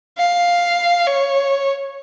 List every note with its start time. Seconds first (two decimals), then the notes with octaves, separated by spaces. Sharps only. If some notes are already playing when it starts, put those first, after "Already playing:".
0.18 F5
1.07 C#5